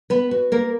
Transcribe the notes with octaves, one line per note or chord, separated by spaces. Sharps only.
B3 B4
F#4
A#3 A#4